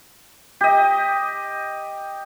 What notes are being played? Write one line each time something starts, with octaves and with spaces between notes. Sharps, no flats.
G4 D#5